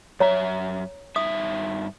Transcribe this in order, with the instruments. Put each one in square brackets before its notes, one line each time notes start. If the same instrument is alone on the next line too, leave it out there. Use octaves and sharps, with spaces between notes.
[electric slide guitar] F#2 E5 [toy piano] C#5 A#5
[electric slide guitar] G2 D#4 E5 [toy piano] D#6